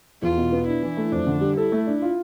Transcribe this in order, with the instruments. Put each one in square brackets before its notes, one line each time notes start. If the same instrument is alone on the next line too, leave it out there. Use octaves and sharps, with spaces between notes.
[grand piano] E2 [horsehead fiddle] F4
[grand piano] B2
B3
[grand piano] D4 [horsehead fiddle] E4
[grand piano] E3
A3
[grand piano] F2 [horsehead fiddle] D4
[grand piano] D3
G3
[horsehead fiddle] E4 [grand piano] A4
[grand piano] A3
D4
F4